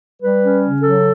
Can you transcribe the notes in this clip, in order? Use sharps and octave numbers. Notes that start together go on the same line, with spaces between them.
G3 B4
C#4
C#3
F#3 A4